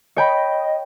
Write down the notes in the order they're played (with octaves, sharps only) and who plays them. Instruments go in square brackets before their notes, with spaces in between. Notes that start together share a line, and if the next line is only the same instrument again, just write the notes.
[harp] C#5 G5 B5 [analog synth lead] D#5